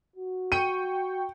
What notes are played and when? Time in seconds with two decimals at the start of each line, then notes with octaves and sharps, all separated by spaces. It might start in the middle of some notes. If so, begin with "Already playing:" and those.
0.16 F#4
0.52 G5 C#6 D#7